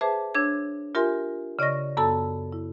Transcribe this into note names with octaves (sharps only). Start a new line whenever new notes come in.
G#4 B4 C5 E5 A5 D6
D4 C#5 E6 G#6
F4 G4 A#4 E5 G#5 C6
C#3 D5 D#5 C#6 A#6
F#2 B3 A4 A5 E6
E4